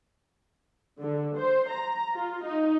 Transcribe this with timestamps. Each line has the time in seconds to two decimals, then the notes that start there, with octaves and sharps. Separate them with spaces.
1.00 D3
1.37 C5
1.70 A#5
2.14 F4
2.44 D#4